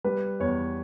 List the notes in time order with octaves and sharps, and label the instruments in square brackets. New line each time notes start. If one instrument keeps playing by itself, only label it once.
[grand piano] G3 B4
E2 C#5